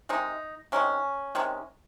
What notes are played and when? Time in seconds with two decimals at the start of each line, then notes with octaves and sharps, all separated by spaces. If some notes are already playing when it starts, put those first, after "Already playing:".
0.09 C3 D#3 G#3 D#4
0.72 C3 D#3 G#3 C#4
1.35 C3 D#3 G#3